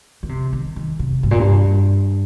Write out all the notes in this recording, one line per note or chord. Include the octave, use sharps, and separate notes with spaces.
D#3
C3
D#3
D#3
C3
G2
A#2
G2